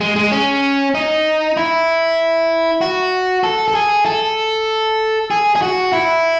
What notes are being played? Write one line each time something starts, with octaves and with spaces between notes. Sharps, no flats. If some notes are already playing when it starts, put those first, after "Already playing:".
G#3
G#3
C#4
D#4
E4
F#4
A4
A4
G#4
A4
G#4
G#4
F#4
E4